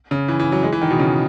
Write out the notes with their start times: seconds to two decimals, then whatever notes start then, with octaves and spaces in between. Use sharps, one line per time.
0.11 C#3
0.28 E3
0.40 E3
0.52 F#3
0.63 G#3
0.72 E3
0.81 D#3
0.91 B2
0.99 C#3